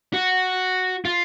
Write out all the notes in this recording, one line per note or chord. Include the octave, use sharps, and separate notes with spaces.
F#4
F4